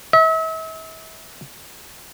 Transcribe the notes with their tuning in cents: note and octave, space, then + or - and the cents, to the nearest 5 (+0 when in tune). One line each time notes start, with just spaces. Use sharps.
E5 -40